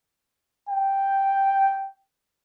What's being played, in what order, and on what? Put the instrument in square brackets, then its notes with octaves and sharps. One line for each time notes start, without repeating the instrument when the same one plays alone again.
[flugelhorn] G5